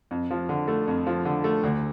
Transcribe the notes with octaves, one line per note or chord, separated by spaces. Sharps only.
F2
F3
D3
A3
F2
F3
D3
A3
D2